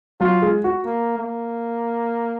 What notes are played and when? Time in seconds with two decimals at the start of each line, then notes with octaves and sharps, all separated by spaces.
0.20 F#3 F4
0.42 G#3
0.64 F#4
0.86 A#3
1.18 A#3